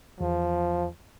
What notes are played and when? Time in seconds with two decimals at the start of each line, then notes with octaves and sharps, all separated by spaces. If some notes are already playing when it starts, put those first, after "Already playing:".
0.20 E2 F3